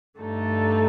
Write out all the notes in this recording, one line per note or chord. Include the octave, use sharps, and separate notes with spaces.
G2 D3 A3 D#4 A4